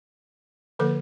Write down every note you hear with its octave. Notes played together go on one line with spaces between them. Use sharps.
D3 F3 A#3 A4 B4